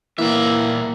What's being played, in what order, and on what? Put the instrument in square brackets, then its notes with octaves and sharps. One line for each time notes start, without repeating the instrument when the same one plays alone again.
[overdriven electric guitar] A#2 E5 [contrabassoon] E3 [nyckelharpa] A#3